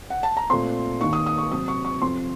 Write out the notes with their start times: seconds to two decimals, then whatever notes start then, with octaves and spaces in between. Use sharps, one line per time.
0.10 F#5
0.23 A5
0.37 A#5
0.50 A#2 A3 C4 C6
1.01 D#2 D#3 A#3 C#6
1.13 D#6
1.26 D#6
1.38 C#6
1.51 C3 F#3 C4 D#6
1.68 C#6
1.85 C#6
2.01 F2 C3 F3 C4 C6